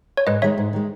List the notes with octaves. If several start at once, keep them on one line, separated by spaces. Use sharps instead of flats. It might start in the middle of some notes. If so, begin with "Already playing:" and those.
C#5
G#2 B4 D#5
D#3 G#3 C#5 E5
G#2
D#3 G#3